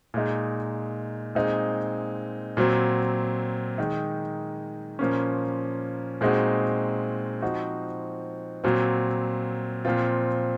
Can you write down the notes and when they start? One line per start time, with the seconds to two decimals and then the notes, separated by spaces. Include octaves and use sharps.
0.14 A#2 G#3 D#4
1.35 A#2 G#3 C4 D#4
2.57 A#2 F#3 C4
3.78 D#3 G#3 D#4
4.99 A#2 F3 A#3 C#4
6.21 A#2 G#3 C4 D#4 F#4
7.42 F3 C4 D#4 F#4
8.64 A#2 F#3 C4
9.85 A#2 F3 C4 F4